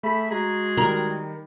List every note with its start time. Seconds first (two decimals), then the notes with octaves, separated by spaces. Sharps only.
0.03 A3 G#4 A4 E5 B5
0.31 G#3 F#4 G#4 A#5
0.78 D#3 G3 A#4